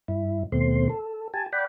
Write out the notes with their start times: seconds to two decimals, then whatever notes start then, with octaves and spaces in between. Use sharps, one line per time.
0.08 G2 E4
0.52 D#2 B2 A3 C4 C6
0.89 A4
1.34 G4 G#5 A5
1.52 D5 F#5 G5 B5